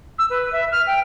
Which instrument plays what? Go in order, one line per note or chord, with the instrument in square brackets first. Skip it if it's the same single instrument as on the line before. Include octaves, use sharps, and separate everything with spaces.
[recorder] E6
B4
E5
F6
G5